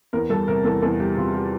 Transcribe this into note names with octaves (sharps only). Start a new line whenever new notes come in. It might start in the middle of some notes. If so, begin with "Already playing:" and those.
E2 A#4
G3 A4
C3 A#4
E2 A4
E2 A4
G3 G4
C3 F4
G4